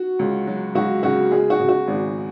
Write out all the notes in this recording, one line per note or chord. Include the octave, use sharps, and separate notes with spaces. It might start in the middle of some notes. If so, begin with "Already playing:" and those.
Already playing: F#4
C#2
F#3
C#2 F#4
C#3 F#4
G#3 G#4
F#4
C#3
F#4
G#1